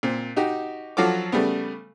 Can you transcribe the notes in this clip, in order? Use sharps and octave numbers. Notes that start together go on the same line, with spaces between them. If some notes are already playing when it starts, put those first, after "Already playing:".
A#2 C4
D#4 F#4 G4
F3 F#3 F4 F#4 A4 D6
C#3 G3 A3 B3